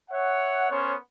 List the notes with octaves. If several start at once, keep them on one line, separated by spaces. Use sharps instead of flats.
C#5 E5 F#5
B3 C#4 A#4 C5 C#5